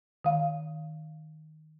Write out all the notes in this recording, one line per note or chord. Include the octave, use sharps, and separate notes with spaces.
D#3 F5